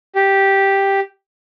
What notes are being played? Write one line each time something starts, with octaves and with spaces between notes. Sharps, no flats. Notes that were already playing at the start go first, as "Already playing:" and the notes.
G4